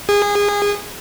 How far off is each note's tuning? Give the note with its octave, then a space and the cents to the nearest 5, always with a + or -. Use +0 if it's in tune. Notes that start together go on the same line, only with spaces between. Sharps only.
G#4 -25